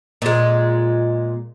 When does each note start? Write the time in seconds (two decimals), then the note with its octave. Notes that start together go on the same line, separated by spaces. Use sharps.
0.22 A#2 G#3